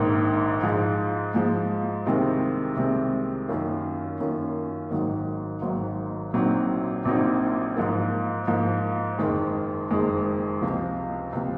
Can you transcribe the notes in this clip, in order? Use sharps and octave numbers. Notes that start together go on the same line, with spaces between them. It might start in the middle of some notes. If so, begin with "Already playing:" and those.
Already playing: A#1 G#2 D#3 A#3 D#4
G#2 F3 G#3
G#2 F3 G#3
C2 C3 D#3 G#3 C4
C2 C3 D#3 G#3 C4
F#2 D#3 A#3 C#4 F4
F#2 D#3 A#3 C#4 F4
G#1 G#2 D#3 F#3
G#1 G#2 D#3 F#3
A#1 A#2 F#3 C4 D#4
A#1 A#2 F#3 C4 D#4
G#2 F3 A#3
G#2 F3 A#3
F#1 F2 D#3 G#3
F#1 F2 D#3 G#3
C#2 C3 F3
C#2 C3 F3